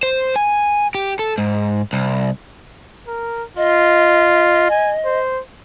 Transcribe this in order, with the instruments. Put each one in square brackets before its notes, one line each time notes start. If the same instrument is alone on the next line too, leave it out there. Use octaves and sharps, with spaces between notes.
[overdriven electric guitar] C5
G#5
G4
A4
G#2
C2
[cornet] A#4
[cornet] F4 [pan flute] D#5
[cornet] G#5
C5